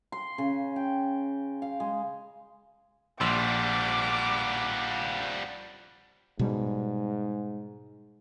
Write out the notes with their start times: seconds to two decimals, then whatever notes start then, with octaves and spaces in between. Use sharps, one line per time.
0.12 C6
0.38 C#3
0.76 G5
1.62 F5
1.80 G#3
3.21 A#1 F3 G3 F#5 C6 D6 E6
6.39 G#2 B2 G3